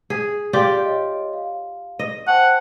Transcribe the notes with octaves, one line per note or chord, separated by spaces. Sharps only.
G#4
F4 G4 D5
C#5 D#5
F5
D#5
C5 F#5 G5 A5